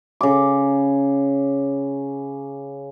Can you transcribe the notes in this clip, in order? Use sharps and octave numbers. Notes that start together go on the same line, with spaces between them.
C#3 D6